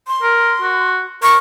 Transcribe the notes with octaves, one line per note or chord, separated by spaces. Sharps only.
C6
A#4
F#4
A#4 C#6